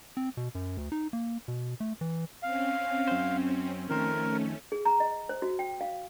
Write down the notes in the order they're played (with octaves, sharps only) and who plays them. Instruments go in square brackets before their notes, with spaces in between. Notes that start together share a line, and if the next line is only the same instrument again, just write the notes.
[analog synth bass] C4
B2
F#2
D2
D#4
A#3
B2
A3
E3
[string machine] C4 C#4 [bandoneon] F5
[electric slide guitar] F#2 C5
[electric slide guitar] F2 D#3 C5 [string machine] A3 C#4 [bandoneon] A#4
[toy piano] G#4
A#5
D#5
C5
F#4
G5
F5